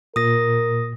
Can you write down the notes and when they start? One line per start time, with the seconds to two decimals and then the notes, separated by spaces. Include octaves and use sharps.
0.16 A#2 A#4 D#6 A#6